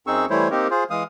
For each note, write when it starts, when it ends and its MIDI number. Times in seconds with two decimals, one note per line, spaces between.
0.07 0.26 42
0.07 0.26 60
0.07 0.26 63
0.07 0.26 68
0.07 0.26 85
0.07 0.26 88
0.30 0.48 52
0.30 0.48 55
0.30 0.48 57
0.30 0.48 64
0.30 0.48 72
0.30 0.48 73
0.51 0.68 58
0.51 0.68 60
0.51 0.68 63
0.51 0.68 67
0.51 0.68 70
0.70 0.84 65
0.70 0.84 68
0.70 0.84 72
0.90 1.03 52
0.90 1.03 56
0.90 1.03 77
0.90 1.03 87